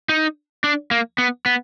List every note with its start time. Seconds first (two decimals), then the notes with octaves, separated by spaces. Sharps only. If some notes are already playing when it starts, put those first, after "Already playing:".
0.09 D#4
0.64 D4
0.91 A#3
1.18 B3
1.46 B3